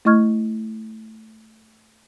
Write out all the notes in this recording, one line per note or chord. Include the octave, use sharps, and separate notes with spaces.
A3 E4 D#5 C#6 F6 G#6